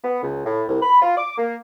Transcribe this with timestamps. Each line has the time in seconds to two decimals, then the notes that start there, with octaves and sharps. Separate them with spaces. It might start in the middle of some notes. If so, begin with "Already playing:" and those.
0.03 B3
0.23 C#2
0.45 A2
0.69 C2
0.82 B5
1.02 F4
1.17 D6
1.38 A#3